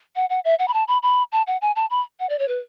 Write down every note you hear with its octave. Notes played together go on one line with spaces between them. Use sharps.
F#5
F#5
E5
F#5
B5
A5
B5
B5
A5
F#5
G#5
A5
B5
F#5
D5
C#5
B4